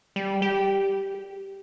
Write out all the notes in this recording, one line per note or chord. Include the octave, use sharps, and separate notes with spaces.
G3
G4